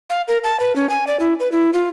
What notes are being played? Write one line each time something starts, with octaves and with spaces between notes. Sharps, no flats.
F5
A#4
A5
B4
C#4
G#5
D5
E4
B4
E4
F4